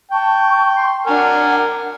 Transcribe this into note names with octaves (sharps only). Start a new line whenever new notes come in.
G5 A5 C#6
C6
D4 A#4 F#5 G#5 F6